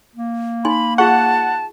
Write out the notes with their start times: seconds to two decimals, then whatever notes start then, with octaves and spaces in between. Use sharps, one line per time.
0.16 A#3
0.65 D#4 G#5 B5 C6
0.98 F4 G#4 F#5 A5 C#6